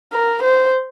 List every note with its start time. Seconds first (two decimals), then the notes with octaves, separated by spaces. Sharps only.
0.13 A#4
0.43 C5